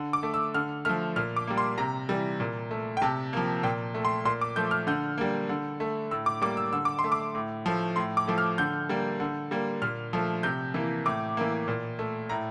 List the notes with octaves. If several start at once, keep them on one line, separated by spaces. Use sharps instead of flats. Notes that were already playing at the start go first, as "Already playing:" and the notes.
Already playing: D3
D6
A3
E6
D3 F6
F3 A3 F6
A#2 F6
D6
G3 A#3
C6
C3 A#5
E3 G3
A#2
A3
G5
C3 A5
F3 A#3
A#2 G5
A3
C6
A#2 C6
D6
F3 A3 G6
F6
D3 G6
G3 A#3
D3
A3
A2 E6
D6
G3 A#3 D6
E6
D3 E6
D6
C6
A3
D6
A2
F3 A3
A2 C6
D6
F3 A3
F6
D3 G6
G3 A#3
D3
G3 A#3
A#2 F6
F3 A3
C3 G6
E3 A#3
A2 D6
E3 A#3
A#2
A3
A2 A#5